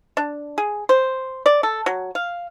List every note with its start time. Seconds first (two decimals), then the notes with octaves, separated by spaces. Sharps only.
0.17 D4
0.58 G#4
0.89 C5
1.46 D5
1.63 A4
1.86 F#3
2.15 F5